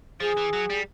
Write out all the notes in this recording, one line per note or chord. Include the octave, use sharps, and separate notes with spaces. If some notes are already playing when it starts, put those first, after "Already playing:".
F3 G#4
E3
F#3
G3